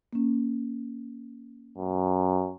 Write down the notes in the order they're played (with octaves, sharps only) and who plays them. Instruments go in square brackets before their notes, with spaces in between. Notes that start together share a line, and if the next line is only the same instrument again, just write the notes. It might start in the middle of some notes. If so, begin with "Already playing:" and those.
[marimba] A#3 C#4
[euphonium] F#2